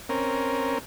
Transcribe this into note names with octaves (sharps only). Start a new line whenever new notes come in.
C4 C#4 A#4